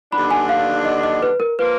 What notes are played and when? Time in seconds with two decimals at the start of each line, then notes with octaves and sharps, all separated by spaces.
0.12 D#2 D3 F#3 B3 D4 B5
0.31 G#5
0.49 F5
0.85 D#5
1.04 D#5
1.22 B4
1.40 A#4
1.59 F3 A#3 B4